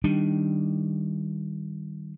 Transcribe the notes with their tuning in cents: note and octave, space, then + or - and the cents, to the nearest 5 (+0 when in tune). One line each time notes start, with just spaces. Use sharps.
D#3 +0 G3 +0 D4 +0